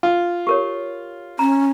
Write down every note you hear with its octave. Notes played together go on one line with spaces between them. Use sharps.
F4
G4 A#4 C#5
C#4 A#5